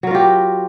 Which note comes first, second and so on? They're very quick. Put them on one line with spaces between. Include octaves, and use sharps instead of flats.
F#3 A#4 F4 G4